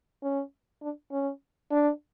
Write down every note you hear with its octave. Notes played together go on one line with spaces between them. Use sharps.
C#4
D4
C#4
D4